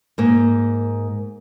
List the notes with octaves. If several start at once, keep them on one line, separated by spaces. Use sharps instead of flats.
G#2 A#3